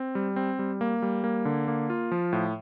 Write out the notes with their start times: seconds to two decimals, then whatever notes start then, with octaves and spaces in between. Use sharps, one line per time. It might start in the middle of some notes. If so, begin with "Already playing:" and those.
Already playing: C4
0.15 G3
0.36 C4
0.59 G3
0.81 A#3
1.02 G3
1.24 A#3
1.45 D3
1.68 A#3
1.90 F4
2.11 F3
2.33 A2